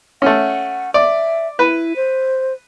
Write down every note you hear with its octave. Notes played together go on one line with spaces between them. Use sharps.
A3 C#4 F#5
D5 E5
E4 B4
C5